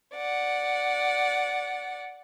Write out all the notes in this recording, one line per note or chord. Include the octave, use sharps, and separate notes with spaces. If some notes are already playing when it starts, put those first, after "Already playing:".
D5 F#5